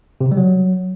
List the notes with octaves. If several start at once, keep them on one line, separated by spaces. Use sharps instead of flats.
C3
C#3
G3
F#3